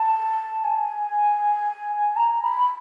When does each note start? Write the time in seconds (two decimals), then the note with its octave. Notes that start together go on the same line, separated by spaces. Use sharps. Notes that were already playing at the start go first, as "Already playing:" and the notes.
Already playing: A5
0.64 G#5
2.16 A#5
2.43 B5